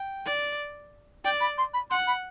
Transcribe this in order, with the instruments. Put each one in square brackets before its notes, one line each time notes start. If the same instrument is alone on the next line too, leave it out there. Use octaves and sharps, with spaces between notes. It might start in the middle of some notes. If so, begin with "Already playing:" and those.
Already playing: [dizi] G5
[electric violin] D5
[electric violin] D5 [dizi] G5
[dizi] B5
C6
B5
[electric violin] F#5 [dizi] C6
[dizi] B5